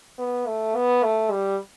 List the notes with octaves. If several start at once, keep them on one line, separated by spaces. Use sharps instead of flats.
B3
A3
B3
A3
G3